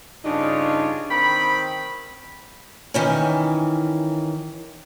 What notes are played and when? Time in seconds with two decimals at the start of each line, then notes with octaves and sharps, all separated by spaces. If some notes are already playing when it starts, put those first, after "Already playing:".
0.25 G2 C#3 D4 D#4 F4 C#5
1.11 D#3 C4 G5 B5
2.94 D#3 E3 C#4